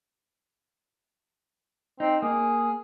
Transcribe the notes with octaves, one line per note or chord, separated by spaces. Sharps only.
C4 D#4
A#3 G#4